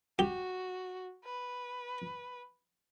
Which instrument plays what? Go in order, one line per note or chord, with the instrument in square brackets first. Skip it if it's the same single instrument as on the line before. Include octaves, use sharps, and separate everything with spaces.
[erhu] F#4 [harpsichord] G4
[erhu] B4